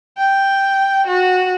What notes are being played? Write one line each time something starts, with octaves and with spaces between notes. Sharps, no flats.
G5
F#4